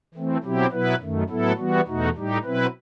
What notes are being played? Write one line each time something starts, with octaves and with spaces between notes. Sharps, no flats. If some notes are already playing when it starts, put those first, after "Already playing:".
E3 A3 C4
B2 F#3 C4 E4 G4
B2 F#3 B3 E4 B4
F#2 D#3 A3
A2 F#3 B3 E4 A4
E3 G3 B3 F#4
E2 B2 A3 D#4 F#4
A2 G3 D#4 G4
B2 F#3 C4 E4 B4